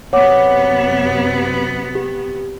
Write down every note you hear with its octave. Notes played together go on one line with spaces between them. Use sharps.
F#2 C3 B3 C#5 F#5 D6
G4